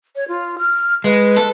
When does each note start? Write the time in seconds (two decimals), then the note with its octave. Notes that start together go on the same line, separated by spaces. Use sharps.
0.16 C#5
0.28 F4
0.58 F6
1.04 G#3 B4
1.37 A4